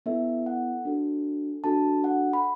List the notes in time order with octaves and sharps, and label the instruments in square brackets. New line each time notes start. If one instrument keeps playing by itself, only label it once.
[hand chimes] B3 E4 A4 E5
F#5
D4 F#4 A4
D4 F#4 A4 A5
F#5
B5